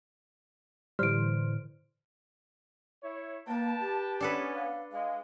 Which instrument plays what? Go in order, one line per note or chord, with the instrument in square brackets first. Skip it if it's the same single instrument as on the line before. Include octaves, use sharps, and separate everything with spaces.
[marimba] A2 D3 [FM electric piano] E3 C5 [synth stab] G3 [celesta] F6 D7
[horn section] E4 C#5
[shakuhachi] A#3 [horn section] B4 G5 A5
[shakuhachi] G4
[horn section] B3 C#4 [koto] D4 A4 B4
[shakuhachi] F5
[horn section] G#3 [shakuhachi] F5